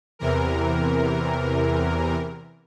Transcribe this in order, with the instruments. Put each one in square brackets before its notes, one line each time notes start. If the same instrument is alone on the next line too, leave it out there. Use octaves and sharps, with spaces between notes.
[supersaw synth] E2 C3 E3 A#4